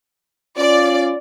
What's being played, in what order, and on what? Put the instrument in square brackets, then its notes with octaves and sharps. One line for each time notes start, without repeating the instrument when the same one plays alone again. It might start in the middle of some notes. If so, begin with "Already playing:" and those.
[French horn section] C#4 F4 [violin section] D5